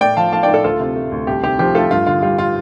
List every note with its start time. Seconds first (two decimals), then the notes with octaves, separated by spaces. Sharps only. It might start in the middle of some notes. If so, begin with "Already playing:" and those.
0.01 A2 D5 G5
0.17 F3 F5 A5
0.32 A3 F5 A5
0.43 D5 G5
0.48 A2
0.53 A4 D5
0.64 D2 F4 A4
0.80 C3
0.96 A3
1.12 D2
1.27 C2 G4
1.43 C3 G4
1.59 F3 G4
1.75 A3 F4 A4
1.91 G2 F4
2.07 D3 F4
2.22 G3 F4
2.38 F4